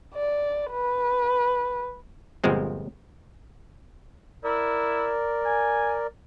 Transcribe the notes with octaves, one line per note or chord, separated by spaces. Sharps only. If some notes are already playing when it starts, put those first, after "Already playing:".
D5
B4
G1 A#2 F3 G#3 C4
E4 A#4 D5
G#5